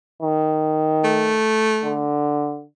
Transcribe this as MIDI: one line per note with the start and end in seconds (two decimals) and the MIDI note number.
0.22 1.41 51
1.04 2.09 57
1.85 2.64 50